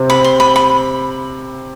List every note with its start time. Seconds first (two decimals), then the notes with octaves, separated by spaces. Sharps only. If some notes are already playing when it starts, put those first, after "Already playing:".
Already playing: C3 C4
0.10 B5
0.24 C6
0.40 B5
0.56 B5